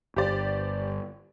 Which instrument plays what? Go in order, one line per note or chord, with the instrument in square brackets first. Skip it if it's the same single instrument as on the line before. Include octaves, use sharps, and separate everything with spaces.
[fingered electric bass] G1 [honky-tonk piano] G4 C5 D5